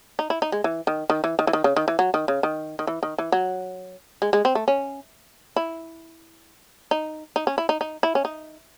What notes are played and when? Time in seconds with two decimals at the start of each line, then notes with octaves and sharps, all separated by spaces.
0.19 D#4
0.30 E4
0.42 D#4
0.52 G#3
0.64 E3
0.87 D#3
1.10 D#3
1.24 E3
1.39 D#3
1.47 E3
1.53 D#3
1.64 C#3
1.76 D#3
1.88 E3
1.99 F#3
2.14 D#3
2.28 C#3
2.43 D#3
2.79 D#3
2.87 E3
3.03 D#3
3.18 E3
3.32 F#3
4.22 G#3
4.33 G#3
4.45 C4
4.55 A3
4.68 C#4
5.56 E4
6.91 D#4
7.36 D#4
7.47 C#4
7.58 E4
7.69 D#4
7.81 D#4
8.03 E4
8.15 C#4
8.25 D#4